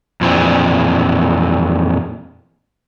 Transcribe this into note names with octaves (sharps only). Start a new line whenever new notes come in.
F2 A#2 E3 C4 D4